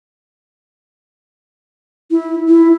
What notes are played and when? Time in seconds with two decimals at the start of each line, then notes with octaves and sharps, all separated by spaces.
2.11 E4
2.48 E4